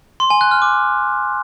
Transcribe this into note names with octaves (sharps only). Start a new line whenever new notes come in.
C6
G#5
F#6
F6
D6